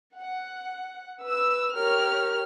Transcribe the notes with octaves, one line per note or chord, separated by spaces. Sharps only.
F#5
B4 E6
G4 A#4 C#5 F6